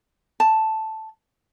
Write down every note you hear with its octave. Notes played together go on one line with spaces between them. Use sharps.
A5